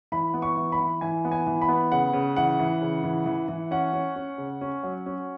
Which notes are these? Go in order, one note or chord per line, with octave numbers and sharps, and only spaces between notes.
E3 B5
B3
C#6
E3
B5
E3
E3 G#5
B3
G#5
E3
B5
B3
C#3 F#5
C#3
E3 F#5
E3
C#3
E3
E3
E3
C#4 F#5
C#4
C#4
C#3
C#4
F#3
C#4